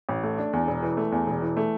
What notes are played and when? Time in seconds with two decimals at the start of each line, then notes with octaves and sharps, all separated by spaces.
0.09 A1
0.23 A3
0.38 D4
0.53 E2
0.67 E1
0.83 E3
0.97 A3
1.12 E2
1.27 E1
1.41 E3
1.57 A3